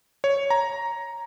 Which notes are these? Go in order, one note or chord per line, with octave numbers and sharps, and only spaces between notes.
C#5
A#5